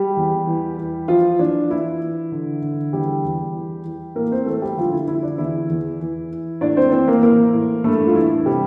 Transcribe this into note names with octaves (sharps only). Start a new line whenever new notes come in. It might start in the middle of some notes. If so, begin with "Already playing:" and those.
Already playing: G3 G4
E2
E3
E3
E3 F3 F4
E3 D4
E3 E4
E3
D3
D3
E2 G3 G4
E2
E3
E3
A2 A#3 A#4
C4 C5
E3 A3 A4
G3 G4
D3 F3 F4
E4
D3 E4
D4
E2 E4
E2
E3
E3
A2 D4 D5
C4 C5
E3 C4 C5
A#3 A#4
E3 A#3 A#4
A2
G2 A3 A4
F4
E3 E4
C3 G3 G4